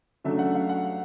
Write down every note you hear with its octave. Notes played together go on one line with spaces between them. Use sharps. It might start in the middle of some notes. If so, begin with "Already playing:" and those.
C#3 F#3 A3 D4 E5
F#5
F5
F#5